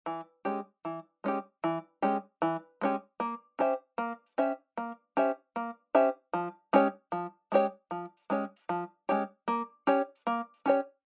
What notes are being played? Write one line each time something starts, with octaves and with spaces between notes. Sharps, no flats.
E3
G#3 C#4 G4
E3
G#3 C#4 G4
E3
G#3 C#4 G4
E3
G#3 C#4 G4
A#3
C#4 G4 C5 E5
A#3
C#4 G4 C5 E5
A#3
C#4 G4 C5 E5
A#3
C#4 G4 C5 E5
F3
G#3 C#4 G4 C#5
F3
G#3 C#4 G4 C#5
F3
G#3 C#4 G4 C#5
F3
G#3 C#4 G4 C#5
A#3
C#4 G4 C#5
A#3
C#4 G4 C#5